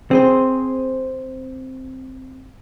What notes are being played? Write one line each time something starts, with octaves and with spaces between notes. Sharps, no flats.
C4 G#4 C5